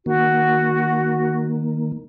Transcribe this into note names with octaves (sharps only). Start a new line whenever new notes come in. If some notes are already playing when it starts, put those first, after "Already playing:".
D#3 A#3 F#4